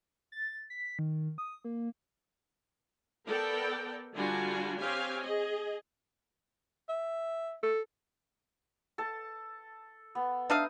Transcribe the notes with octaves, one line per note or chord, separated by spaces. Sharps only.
A6
B6
D#3
D#6
A#3
B3 A4 A#4 D5 G5
D3 G3 D4 F4 F#4 G#5
C4 G4 C#5 F5 G#5
G#4 D#5
E5
A4
A4 A5
B3
D4 D#4 E5 F5 D#6